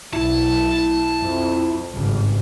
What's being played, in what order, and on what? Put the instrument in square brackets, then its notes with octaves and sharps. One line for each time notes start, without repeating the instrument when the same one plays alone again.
[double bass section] B1 [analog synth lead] E4 [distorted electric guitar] A5
[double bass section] F2
G#1 G2 C#3